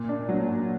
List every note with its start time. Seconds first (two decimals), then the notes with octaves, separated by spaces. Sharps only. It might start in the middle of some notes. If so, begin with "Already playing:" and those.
Already playing: A#2
0.09 D4
0.29 F#3
0.48 A#2